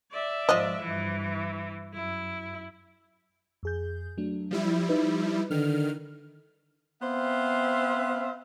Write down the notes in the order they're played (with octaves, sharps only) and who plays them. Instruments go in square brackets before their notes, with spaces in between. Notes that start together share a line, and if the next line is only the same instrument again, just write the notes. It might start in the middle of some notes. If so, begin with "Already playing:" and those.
[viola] D5 E5
[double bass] G#2 F3 [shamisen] F4 D#5 [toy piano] C5
[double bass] G2 [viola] E3
[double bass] F#2 [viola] E4
[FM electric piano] F2 G#4 G6
F#3 A3 D4
[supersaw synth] F3 G3 E4
[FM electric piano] D#4 B4
[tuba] D3 [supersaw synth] D#3 F6
[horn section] B3 C4 C5 E5 F5